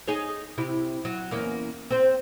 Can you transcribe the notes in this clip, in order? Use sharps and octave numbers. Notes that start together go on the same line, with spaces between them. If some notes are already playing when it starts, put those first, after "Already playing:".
D#4 G#4 C#5
C3 E4 G4
F#3
E2 A#3 C#4
C4 C5